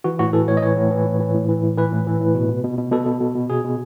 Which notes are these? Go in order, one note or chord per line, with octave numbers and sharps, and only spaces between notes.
E3 F#4
A2 F#4
E3 A4
A2 C#5
D#5
E3 C#5
A2
E3
A2
E3
A2
E3
A2
E3 B4
A2
E3
A2
B2
B2
B2
B2
B2 A4
B2
B2
B2
B2 G#4
B2